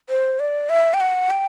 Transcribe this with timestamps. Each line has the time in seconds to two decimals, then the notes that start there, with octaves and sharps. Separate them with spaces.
0.10 C5
0.40 D5
0.69 E5
0.94 G5
1.00 F#5
1.30 G5